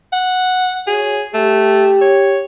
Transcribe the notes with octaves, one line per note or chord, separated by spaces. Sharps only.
F#5
F#4 G#4 C#5
A3 G4
C#5